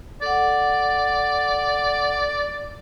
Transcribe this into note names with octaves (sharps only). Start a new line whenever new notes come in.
A4 D5 F#5